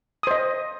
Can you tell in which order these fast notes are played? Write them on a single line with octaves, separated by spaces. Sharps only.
D#6 C5 D#5